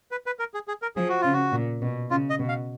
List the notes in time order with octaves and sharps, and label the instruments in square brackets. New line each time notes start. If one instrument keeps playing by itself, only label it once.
[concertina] B4
B4
A#4
G#4
G#4
A#4
[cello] F3 [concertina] G#4
[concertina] F#4
[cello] C#3 [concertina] F4
[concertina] F#4
[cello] A#2
B2
[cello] C#3 [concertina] F4
[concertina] D#5
[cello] B2
[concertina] F5